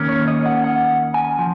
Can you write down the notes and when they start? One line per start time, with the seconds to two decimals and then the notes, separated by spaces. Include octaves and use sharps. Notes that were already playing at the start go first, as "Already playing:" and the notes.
Already playing: D#2 D#3 A#3 C#4
0.09 C#5
0.27 D#5
0.46 F#5
0.64 F#5
1.14 G#5
1.39 F3